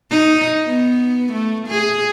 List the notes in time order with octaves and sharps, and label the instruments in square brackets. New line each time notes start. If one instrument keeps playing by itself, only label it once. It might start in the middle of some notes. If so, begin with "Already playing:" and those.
[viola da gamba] D#4
B3
A3
G#4